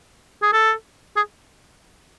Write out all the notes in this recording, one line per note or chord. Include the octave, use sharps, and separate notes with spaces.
G#4
A4
G#4